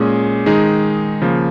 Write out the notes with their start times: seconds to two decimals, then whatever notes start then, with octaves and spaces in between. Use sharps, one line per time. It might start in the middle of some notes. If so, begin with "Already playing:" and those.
Already playing: A#2 G#3 C#4 G#4
0.46 D#3 G#3 D#4 G#4
1.22 C#3 F3 A#3